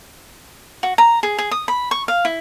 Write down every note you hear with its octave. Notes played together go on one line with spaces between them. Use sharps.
F#4
A#5
G#4
G#4
D#6
B5
C#6
F5
E4